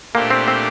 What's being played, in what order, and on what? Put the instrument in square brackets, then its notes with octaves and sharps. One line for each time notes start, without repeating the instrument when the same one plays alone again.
[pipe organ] A#2 A3 D4 G4 C5 [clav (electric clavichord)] A#3
[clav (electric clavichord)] C4
C4